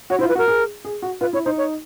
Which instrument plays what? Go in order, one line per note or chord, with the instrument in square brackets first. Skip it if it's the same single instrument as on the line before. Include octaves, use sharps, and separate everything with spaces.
[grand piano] F#4 [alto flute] C#5
[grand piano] E4 [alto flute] C5
[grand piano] F4
[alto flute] B4
[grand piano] F#4
[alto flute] A#4
[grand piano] G#4
G#4
F#4
[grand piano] F4 [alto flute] B4
[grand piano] E4 [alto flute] C#5
[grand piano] D#4 [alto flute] C5
[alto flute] C#5